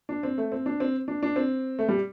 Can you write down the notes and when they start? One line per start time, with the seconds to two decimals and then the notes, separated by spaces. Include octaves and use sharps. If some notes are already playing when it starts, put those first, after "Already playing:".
0.09 D4
0.23 C4
0.38 A3
0.52 C4
0.66 D4
0.80 C4
1.08 D4
1.23 D4
1.36 C4
1.79 A3
1.88 G3